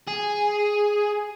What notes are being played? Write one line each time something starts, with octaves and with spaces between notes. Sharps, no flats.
G#4